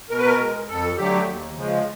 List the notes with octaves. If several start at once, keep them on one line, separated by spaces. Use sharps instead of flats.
B2 A#4
B4
A#4
G#3
F2 A4
D3 F#3 A3 G4
D#2
C#3 F3 G#3